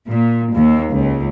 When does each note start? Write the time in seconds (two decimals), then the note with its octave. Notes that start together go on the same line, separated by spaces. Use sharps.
0.10 A#2
0.54 D#2
0.92 C#2